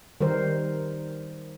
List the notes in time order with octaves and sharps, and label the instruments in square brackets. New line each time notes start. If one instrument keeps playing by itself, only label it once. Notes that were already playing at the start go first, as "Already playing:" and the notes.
[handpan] D#3 G3 A#4 C5